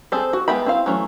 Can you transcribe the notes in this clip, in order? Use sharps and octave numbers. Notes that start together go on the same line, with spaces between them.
C4 G#4 A4 C5
F#4
G#3 B3 E5 G5 B5
C4 E4 C5 F5
E3 F#3 A3 C#4